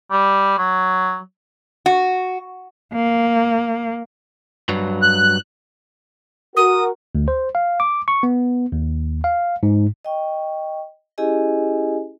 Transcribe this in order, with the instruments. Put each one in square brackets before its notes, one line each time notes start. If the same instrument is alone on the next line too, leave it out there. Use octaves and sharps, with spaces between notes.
[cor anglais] G3
F#3
[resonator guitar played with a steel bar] F#4
[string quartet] A#3
[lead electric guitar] G2 F#3
[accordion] F#6
[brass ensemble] F#4 A#4 [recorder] D#6
[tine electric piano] D2
C5
F5
D6
C#6
B3
D#2
F5
G#2
[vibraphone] D#5 G5 C#6
C#4 E4 G4 G#4 D#5 G#5